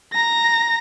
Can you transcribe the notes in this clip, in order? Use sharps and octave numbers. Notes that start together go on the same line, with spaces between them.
A#5 A#6